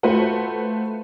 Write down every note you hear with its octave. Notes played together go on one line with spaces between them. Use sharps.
A3 F4 F#4 B4 C5 F#5